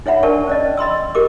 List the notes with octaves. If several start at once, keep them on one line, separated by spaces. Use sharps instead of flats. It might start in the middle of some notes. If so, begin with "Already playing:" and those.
D#4 C#5 E5 F#5 B5
D4 A#4 D5 A5 C#6
C#4 D5 D#5
D#5 B5 C6 E6
G4 A#4 C#6 D6